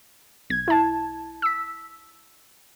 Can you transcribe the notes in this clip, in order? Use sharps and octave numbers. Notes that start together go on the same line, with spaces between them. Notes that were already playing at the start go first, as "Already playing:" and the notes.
B1 G#6
E4 A5
E6 B6